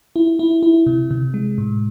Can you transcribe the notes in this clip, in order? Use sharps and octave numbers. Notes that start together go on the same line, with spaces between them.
E4
E4
E4
C3
C3
G#3
A2